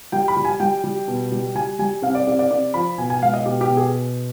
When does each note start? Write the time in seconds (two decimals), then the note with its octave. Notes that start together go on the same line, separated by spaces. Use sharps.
0.12 G3 G5
0.28 B5
0.37 G3
0.45 G#5
0.60 G3 G5
0.84 G3
1.08 B2
1.32 G3
1.55 G3 G#5
1.79 G3 G#5
2.02 C3 F5
2.15 D5
2.27 C3 D5
2.39 D5
2.51 C3 D5
2.74 F3 B5
2.98 B2 G#5
3.10 G#5
3.22 G#3 F5
3.34 D#5
3.46 B2 G4
3.61 G4
3.69 B2
3.77 G#4